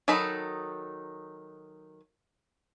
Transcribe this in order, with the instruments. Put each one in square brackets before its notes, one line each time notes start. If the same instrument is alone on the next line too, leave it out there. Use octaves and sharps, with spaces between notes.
[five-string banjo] D#3 F#3 D#4 A4 B5